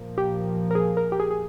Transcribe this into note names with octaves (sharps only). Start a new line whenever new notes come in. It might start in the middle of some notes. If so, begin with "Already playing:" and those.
Already playing: A#2 F3 A#3
G4
A#4
G#4
A#4
G4
G#4
G#4